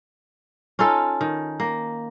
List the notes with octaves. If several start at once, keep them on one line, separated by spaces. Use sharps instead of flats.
C#4 D#4 F4 A4
D#3
A#3